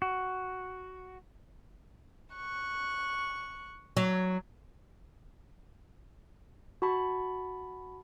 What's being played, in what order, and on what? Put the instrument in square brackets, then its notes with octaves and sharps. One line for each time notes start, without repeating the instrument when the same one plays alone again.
[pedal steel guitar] F#4
[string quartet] C#6 F#6
[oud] F#3
[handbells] F#4 A5 B5 C#6